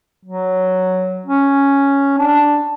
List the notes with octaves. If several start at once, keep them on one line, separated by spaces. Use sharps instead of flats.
F#3
C#4
D4